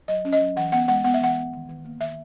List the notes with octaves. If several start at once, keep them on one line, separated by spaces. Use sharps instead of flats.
F#3 D#5
C#4
D#5
F#3
E3 F#5
B3 F#5
G#3 F#5
B3 F#5
E5
E3 F#5
B3
D#3
D#3
A#3
D#3 E5